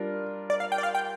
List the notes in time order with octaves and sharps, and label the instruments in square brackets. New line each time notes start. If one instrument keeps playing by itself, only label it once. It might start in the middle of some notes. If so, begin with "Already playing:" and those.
Already playing: [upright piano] G3 D4 F4 A#4
[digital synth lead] D5
F5
G5
D5
F5
G5